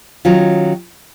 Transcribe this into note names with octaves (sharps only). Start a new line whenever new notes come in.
D#3 F#3 C#4 F4